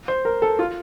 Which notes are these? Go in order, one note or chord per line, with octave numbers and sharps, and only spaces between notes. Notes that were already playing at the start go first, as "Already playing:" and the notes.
C5
A#4
A4
F4